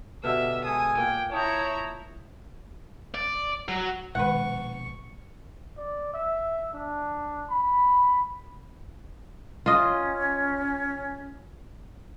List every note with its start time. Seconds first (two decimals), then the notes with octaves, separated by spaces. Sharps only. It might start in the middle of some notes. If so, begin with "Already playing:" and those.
0.24 B2 D3 G3 D#5 E5 E6 F6
0.64 G#3 A4 G#5 D#6
0.97 A#2 G5
1.32 E4 C#5 A5 A#5 D#6 G6
3.14 D5
3.69 F#3
4.15 A#1 B2 D#3 G#3 D4 B4 F#5 C#6
5.77 D5
6.14 E5
6.73 D4
7.50 B5
9.66 C#4 F4 D#5